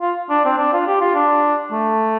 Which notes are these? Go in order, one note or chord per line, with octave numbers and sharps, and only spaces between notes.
F4
D4
C4
D4
F4
G4
F4
D4
A3